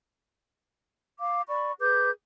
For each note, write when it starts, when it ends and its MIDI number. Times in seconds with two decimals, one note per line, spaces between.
1.19 1.42 77
1.19 1.42 86
1.49 1.72 74
1.49 1.72 83
1.49 1.72 85
1.80 2.09 68
1.80 2.09 71
1.80 2.09 86
1.80 2.09 91